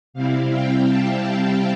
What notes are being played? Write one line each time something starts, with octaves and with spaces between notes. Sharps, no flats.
C3 G3 C4 E4 F5
G5
A5
F5